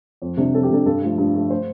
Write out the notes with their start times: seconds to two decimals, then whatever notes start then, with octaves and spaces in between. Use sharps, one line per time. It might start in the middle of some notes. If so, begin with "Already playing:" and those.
0.22 F2
0.37 C3 G3 D4
0.54 F2 A4
0.63 G4
0.70 C3 G3 D4 A4
0.86 G2 A4
1.02 F3 A3
1.18 G2
1.35 F3 A3
1.50 C5